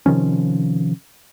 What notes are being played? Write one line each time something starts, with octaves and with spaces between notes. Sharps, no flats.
C3 D#3 F3 C#4